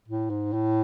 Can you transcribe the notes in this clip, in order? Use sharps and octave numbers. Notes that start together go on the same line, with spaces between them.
A2
G#2
A2